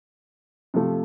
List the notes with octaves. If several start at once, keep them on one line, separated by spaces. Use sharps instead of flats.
C3 F3 A3